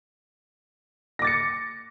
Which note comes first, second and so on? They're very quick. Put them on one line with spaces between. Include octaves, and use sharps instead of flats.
A#6 D6 A6 C#7